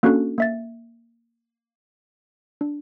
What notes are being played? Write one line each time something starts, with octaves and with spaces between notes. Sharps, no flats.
A#3 C#4 D4 F#4 A4 F#6
A#3 E5 A6
D4